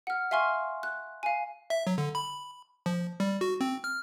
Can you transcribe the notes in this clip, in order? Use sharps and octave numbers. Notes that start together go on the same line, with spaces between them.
F#5 F6
E5 F5 G#5 C6 C#6 F6
F#6
F5 G#5
E5
F#3
D3
B5
F3
G3
F#4
C4
F6